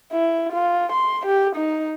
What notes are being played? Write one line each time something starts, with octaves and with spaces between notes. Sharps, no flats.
E4
F4
C6
G4
D#4